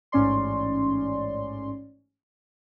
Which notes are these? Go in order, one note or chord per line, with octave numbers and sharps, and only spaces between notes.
A1 G#2 C#4 D5 C6